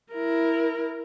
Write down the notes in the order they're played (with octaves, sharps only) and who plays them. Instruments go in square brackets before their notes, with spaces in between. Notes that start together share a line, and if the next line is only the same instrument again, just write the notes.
[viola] E4 A#4